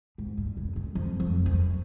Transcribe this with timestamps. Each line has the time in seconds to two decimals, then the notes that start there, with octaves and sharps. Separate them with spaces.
0.18 G#2
0.37 G2
0.57 F#2
0.76 F#2
0.95 F2
1.20 F2
1.46 F#2